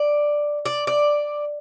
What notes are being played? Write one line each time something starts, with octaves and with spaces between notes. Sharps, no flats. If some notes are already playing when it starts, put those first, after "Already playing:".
Already playing: D5
D5
D5